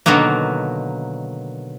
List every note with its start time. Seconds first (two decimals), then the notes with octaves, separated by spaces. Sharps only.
0.06 B2 D3 D#3 F#3 A#3